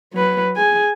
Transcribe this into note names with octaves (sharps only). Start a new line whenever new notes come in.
F#3 B4
G#4 G#5